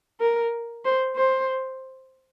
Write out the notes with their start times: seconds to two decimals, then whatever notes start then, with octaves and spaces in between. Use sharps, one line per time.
0.21 A#4
0.85 C5
1.16 C5